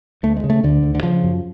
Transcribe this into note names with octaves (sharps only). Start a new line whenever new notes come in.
D2 A3
G#3
C#3
A3
D2 D3
D2
D3
C#3 F3
F#2